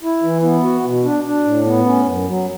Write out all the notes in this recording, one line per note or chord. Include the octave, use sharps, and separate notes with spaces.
E4
E3
B3
F#4
B2
D4
D4
A2
B3
C#4
F#2
F#3